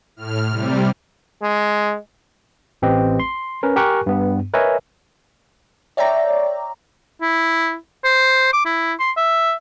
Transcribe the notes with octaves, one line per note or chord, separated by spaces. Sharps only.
A2 F6
C3 G3
G#3
A1 C4 G4 B4 D#5
C6
C#4 A#4 B4
G4 A#4 G#5 C#6 F#6
G2 B3
A#4 B4 C#5 D#5 E5 G#5
C#5 D5 E5 G5 A#5
E4
C5
D6
E4
C6
E5